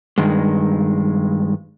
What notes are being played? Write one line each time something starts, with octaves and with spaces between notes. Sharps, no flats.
G2 D#3 G#3